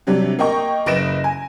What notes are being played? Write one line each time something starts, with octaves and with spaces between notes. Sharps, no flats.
C3 F#3 G3 D4
A#3 D#5 G5 C#6
F#1 B4 D#5 A#6 D7 E7
G#5